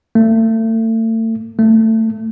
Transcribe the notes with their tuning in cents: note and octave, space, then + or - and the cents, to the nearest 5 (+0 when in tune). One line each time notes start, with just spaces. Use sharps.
A3 +35
A3 +20